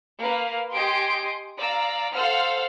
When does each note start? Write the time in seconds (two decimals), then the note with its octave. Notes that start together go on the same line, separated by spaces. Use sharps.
0.21 A#3 B4 F5
0.73 G4 D#5 G#5 C6 D7
1.59 D5 F5 A#5 E6
2.14 A4 C5 F5 F#5 E6 F6